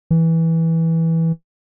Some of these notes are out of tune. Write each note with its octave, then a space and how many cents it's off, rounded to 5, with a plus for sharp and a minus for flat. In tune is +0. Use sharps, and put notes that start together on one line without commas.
E3 -10